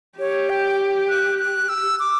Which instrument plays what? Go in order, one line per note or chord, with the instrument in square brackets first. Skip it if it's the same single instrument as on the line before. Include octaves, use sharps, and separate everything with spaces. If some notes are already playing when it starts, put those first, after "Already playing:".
[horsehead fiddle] G4 [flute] C#5
[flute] G5
F#6
F#6
E6
D6